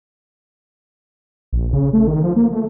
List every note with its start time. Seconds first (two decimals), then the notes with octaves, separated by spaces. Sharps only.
1.53 A#1
1.73 C#3
1.93 A3
2.08 D#3
2.24 F3
2.36 A#3
2.52 A3